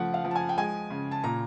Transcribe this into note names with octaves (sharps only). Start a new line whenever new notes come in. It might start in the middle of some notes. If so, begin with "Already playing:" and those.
Already playing: C#3 F3 A3 F#5
F5
F3
A5
G#5
G5
G#3 G#5
C#3
A5
A#2 A#5